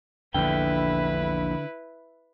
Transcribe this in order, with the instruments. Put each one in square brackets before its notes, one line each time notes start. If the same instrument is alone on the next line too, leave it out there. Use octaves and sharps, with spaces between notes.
[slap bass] A#1 E2 [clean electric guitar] D3 G5 [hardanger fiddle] E4 B4